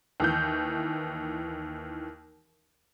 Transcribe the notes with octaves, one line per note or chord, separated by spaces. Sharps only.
D#2 E3 G6